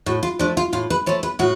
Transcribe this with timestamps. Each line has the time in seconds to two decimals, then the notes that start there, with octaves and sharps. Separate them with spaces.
0.06 A2 F#4
0.23 F4
0.39 F3 A3 D4
0.57 F4
0.73 A2 F4
0.90 B4
1.06 F3 A3 C#5
1.23 B4
1.39 A2 F#4